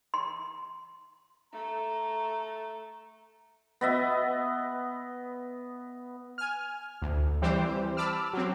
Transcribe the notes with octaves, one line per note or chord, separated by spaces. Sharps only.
C6
A3 A#5
B3 D#5 E5
G#5 F6
D2
E3 G3 C4 G4 C5
A5 B5 D6 E6 F6
F#3 C4